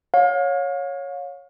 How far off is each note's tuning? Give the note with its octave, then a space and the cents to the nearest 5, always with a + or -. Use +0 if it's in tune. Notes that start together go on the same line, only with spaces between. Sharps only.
C#5 +0 F5 +35